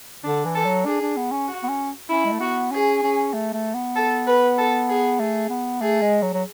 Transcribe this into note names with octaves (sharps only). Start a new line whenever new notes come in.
D3 D4
E3
A4
F#3
D4 G#4
D4
B3
C#4
F#4
B3
C#4
C#4 E4
G#3
A3
B3 F#4
C#4 G#4
C#4
A3
A3
B3
A4
B4
A4
G#4
A3 G#4
B3
A3 G#4
G#3
F#3
F#3